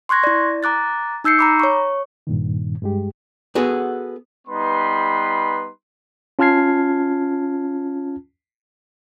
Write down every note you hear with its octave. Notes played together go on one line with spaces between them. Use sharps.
C6 C#6 F#6 G#6 A#6
E4 D5
A#5 D6 F#6 A6
D#4 E6 G6 C7 C#7
A#5 B5 D6
C#5 C#6
G2 A#2 D#3
G2 G#3 G4
B3 F#4 G#4 A4
G3 B3 D#4 B4 B5 C6
C#4 F4 A5 F6 G#6 C7